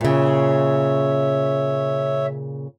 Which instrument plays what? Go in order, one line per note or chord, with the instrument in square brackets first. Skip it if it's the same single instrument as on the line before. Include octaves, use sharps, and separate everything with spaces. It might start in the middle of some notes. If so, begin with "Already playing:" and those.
[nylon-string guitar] A#2 C#3 [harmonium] C#5 E5